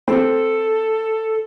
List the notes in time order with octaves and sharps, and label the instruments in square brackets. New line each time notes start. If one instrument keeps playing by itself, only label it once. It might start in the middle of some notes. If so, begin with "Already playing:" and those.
[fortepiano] C4 [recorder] A4